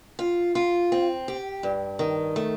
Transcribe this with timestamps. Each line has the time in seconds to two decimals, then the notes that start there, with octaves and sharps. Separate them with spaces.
0.19 F4
0.55 F4
0.92 C4
1.28 G4
1.63 G2
1.99 D#3
2.36 A3